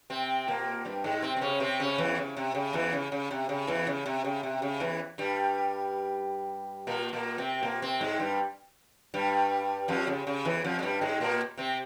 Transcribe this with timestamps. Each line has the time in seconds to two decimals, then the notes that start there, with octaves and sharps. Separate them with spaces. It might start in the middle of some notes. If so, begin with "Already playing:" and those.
0.10 C3 C4
0.48 A#2 A#3
0.85 G2 G3
1.04 G#2 G#3
1.22 C3 C4
1.37 C4
1.41 C#3 C#4
1.60 C3 C4
1.80 C#3 C#4
1.98 E2 E3
2.18 C#3
2.37 C3
2.55 C#3
2.73 E2 E3
2.93 C#3
3.12 C#3
3.31 C3
3.49 C#3
3.67 E2 E3
3.87 C#3
4.06 C3
4.24 C#3
4.43 C3
4.62 C#3
4.80 E2 E3
5.18 G2 G3
6.87 A#2 A#3
7.13 A#2 A#3
7.38 C3 C4
7.63 A#2 A#3
7.82 C3 C4
8.01 G#2 G#3
8.19 G2 G3
9.14 G2 G3
9.88 F2 F3
10.07 C#3
10.27 C#3
10.45 E2 E3
10.64 F2 F3
10.79 G#3
10.83 G2 G3
11.01 G#2 G#3
11.20 A#2 A#3
11.57 C3 C4